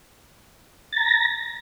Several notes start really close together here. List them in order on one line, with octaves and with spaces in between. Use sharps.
A6 A#5 A#6